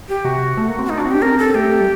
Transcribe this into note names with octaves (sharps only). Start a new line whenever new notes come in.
G4
C3 F#4
A3
A#3
C4
F#4
D#4
D4 F#4
C4
D4 G4
C4 A#4
A4
A3 G4
G3